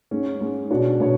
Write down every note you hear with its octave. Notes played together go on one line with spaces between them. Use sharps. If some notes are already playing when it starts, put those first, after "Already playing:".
G#2 G#3 C#4
G#2 G#3 C#4
B2 G#3 D4 F#4 C#5
B2 G#3 D4 F#4 C#5